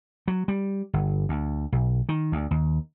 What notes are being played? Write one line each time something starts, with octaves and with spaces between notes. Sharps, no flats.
F#3
G3
G1
D2
B1
D#3
D2
D#2